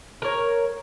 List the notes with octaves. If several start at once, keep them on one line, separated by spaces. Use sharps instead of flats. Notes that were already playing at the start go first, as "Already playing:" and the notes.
A#4 C#5